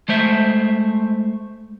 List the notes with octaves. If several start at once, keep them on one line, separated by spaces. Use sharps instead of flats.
G#3 A3 C5 E5